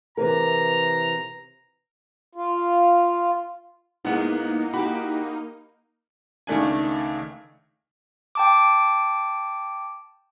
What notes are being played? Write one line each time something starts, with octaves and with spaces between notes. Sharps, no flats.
C3 E3 A#4 A#5
F4
G#2 G#3 A#3 B3 D#4 E4 F#5
F#4 G4 B5
C#2 D#3 A3 D4 G#5
G5 A5 D6